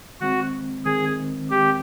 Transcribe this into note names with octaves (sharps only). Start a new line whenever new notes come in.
D#3 G#3 C4 F#4
D#3 G#3 C4 G#4
D#3 G#3 C4 G4